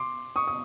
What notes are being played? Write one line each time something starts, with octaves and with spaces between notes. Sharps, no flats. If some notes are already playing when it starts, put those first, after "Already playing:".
Already playing: C6 D6
C#6 D#6
D#6